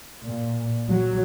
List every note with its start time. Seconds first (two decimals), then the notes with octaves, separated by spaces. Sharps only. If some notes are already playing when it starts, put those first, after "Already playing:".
0.23 A#2
0.89 F#3